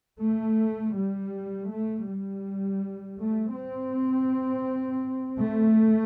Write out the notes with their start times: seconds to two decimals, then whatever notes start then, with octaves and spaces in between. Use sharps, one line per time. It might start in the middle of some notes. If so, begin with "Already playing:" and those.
0.20 A3
0.94 G3
1.69 A3
2.06 G3
3.17 A3
3.55 C4
5.40 A3